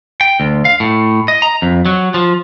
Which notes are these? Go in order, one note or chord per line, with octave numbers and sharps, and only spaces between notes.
G5
D2
F5
A2
D#5
A#5
F2
F#3
F3